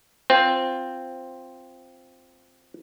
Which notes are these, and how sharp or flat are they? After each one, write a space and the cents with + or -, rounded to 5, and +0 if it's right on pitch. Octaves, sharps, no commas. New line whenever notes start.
C4 +0 F4 +0